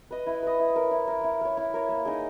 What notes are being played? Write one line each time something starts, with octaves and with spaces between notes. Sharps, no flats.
B4 D#5
E4
B4 D#5
E4
A#4 C#5
E4
A#4 C#5
E4
A#4 C#5
E4
A#4 C#5
A#3
D#4 G#4